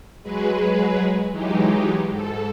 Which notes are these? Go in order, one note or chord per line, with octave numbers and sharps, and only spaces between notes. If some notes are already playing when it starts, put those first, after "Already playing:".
F#3 G#3 G#4 B4
E3 F#3 G#3 D#4 G4
G#2 A4